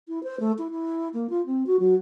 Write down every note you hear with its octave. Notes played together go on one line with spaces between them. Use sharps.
E4
C5
A3
E4
E4
A#3
F4
C4
F#4
F#3